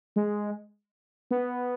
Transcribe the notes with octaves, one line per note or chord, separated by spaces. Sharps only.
G#3
B3